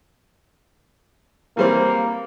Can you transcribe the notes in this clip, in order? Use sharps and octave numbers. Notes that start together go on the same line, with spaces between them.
E3 G3 A#3 C4